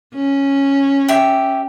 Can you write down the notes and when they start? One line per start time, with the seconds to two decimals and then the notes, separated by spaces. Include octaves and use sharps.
0.15 C#4
1.08 G4 E5